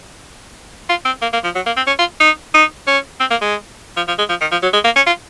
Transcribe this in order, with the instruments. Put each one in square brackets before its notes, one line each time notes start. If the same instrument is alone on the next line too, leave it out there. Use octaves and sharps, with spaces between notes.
[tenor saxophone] F4
C4
A#3
A#3
F3
F#3
A#3
C4
C#4
F4
D#4
D#4
C#4
C4
A#3
G#3
F3
F3
G#3
F3
D#3
F3
F#3
G#3
A#3
C#4
F4